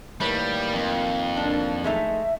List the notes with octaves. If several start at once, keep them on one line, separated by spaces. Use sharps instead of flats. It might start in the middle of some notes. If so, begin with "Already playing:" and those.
A2 D#3 G3 A#3 B4 C#5
F2
D4
G#3 A3 D#4 E5